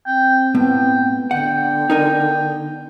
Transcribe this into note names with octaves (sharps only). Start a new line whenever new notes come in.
C4 G5
A2 B3 G5
D3 F#5 G5
D#4 A#4 G#5